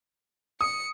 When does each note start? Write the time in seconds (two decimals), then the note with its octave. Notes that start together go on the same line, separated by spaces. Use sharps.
0.61 D#6 C#7